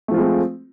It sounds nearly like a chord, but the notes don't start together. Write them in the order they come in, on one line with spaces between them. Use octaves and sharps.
A3 F3 F4 G#3 C4